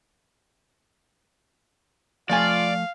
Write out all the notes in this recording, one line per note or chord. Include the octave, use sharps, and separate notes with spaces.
F3 A3 F4 D5 F5 G#5